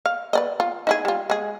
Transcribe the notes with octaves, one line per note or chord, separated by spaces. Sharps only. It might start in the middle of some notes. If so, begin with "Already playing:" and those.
F5
B4 D5 D#5
F4
D#4 E4 G#4
G3 F4
G#3 G#4